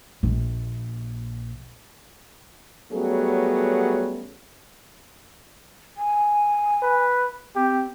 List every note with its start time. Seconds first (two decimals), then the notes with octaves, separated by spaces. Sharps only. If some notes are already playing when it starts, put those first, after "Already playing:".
0.23 A#1 A#2
2.91 F#3 G3 A3 B3 C#4 G#4
5.97 G#5
6.82 B4
7.56 C4 G4